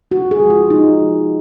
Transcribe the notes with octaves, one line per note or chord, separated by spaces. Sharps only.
C3 F#4
G#4
F3 G#3
F4
C3 D#4
F3 G#3